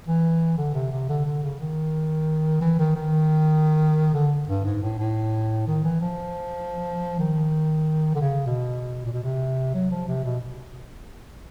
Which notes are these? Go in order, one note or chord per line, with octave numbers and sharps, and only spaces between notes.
E3
D3
C3
C3
D3
D3
C#3
D#3
E3
D#3
D#3
D3
G2
G#2
A2
A2
D#3
E3
F3
D#3
D3
C#3
B2
A#2
B2
C3
F#3
F3
C3
B2